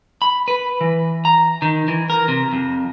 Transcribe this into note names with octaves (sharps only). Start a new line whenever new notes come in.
B5
B4
E3
A#5
D#3
E3
A#4
C3
F2